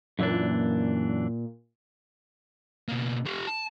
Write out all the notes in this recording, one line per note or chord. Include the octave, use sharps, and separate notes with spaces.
F#2 A#2 E3 D4
B2 A#3
F4 G4
A5